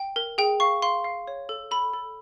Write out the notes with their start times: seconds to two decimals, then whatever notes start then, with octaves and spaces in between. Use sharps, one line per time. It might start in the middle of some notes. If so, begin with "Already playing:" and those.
Already playing: G5
0.16 A#4
0.38 G#4 G5
0.60 F5 C#6
0.82 F5 C6
1.04 F5
1.27 C#5
1.49 A4
1.71 A4 B5
1.94 A4